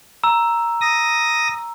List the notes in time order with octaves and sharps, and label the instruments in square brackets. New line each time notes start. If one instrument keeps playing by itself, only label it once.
[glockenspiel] A#5 E6
[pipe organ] D#6 A#6